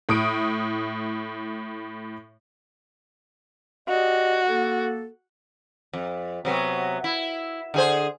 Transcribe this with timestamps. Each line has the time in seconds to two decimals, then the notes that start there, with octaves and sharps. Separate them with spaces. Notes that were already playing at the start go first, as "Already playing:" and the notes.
0.09 A2 D#6 D7
3.88 F#4 G4 D5 D#5
4.48 A#3 A4
5.93 F2
6.45 C3 F#3 B3
7.04 E4
7.74 D3 G#4 C5